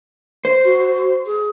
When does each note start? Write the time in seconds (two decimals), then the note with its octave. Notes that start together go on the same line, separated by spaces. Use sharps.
0.45 C5
0.65 F#4
1.26 G#4